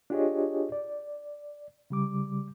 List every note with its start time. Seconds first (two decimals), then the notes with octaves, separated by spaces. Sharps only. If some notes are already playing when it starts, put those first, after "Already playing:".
0.10 D4 F4 G4 G#4 C#5 D#5
0.72 D5
1.90 C#3 G3 D6